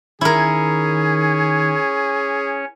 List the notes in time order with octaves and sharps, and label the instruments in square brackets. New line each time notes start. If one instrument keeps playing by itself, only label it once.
[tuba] D#3 [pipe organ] C#4 C#5 [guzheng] E4 A#4 [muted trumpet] G#4